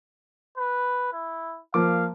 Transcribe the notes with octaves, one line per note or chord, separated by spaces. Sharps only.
B4
E4
F3 A#3 F5 D6